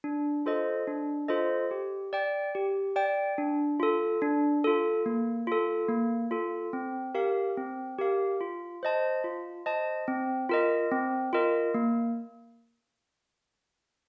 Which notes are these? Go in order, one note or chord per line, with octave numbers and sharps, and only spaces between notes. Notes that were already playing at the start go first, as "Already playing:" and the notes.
D4
F4 A4 C5 D#5
D4
F4 A4 C5 D#5
G4
D5 G5
G4
D5 G5
D4
F4 A4
D4
F4 A4
A#3
F4 A4
A#3
F4 A4
C4
G4 A#4 F5
C4
G4 A#4 F5
F4
C5 D#5 A5
F4
C5 D#5 A5
C4
F4 A#4 D#5
C4
F4 A#4 D#5
A#3